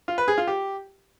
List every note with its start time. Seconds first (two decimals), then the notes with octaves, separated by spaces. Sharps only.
0.08 F4
0.18 B4
0.28 G#4
0.38 F4
0.47 G4